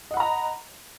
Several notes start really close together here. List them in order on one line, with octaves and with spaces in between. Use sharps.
D#5 F#5 B5 A#5